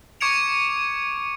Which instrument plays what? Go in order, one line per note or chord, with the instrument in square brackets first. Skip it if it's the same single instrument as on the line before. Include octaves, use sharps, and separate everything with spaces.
[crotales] C#6 D6 G#6 C#7 D7 F7